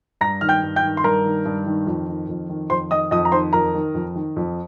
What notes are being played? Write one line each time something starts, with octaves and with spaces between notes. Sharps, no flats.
G2 A#5 A#6
D#3 F6
G5 G6
G2
G5 G6
D#3
C6
G2 A#4 A#5
D#3
G2
D#3
F2
D#3
F2
D#3
F2 C5 C6
D#3 D#5 D#6
F2 D#5 D#6
A#5
D#3 C5 C6
F2 A#4 A#5
D#3
F2
D#3
F2